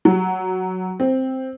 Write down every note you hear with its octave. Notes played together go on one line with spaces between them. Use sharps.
F#3
C4